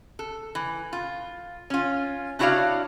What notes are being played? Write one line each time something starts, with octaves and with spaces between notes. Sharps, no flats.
A4
E3
F4
C#4 F4
D4 E4 F#4 C#5 D5 F5